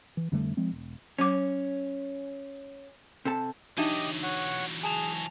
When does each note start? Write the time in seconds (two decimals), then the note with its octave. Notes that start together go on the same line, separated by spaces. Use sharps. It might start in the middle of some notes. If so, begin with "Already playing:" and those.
0.17 E3
0.32 F2 D3 G3 A3
0.57 F3 G#3 C4
0.71 E1
1.19 F#3 C#4 C#5 D6
3.25 C3 A4 A5
3.78 E3 F#3 D4 D#4 G4 D#5 E5 D#7
4.23 C#5 F#5
4.83 G#4 G#5 A5 F7